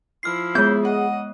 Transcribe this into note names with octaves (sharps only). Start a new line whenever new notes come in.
F3 E4 F6 C7
G#3 B3 G#4 G6
D#5 F#5